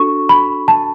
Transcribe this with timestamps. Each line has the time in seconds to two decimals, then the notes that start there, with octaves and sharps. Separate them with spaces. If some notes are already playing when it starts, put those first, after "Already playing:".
Already playing: D4 F#4 A4 C#6
0.29 B5
0.68 A5